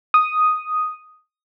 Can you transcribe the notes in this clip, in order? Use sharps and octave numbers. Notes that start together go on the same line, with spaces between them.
D#6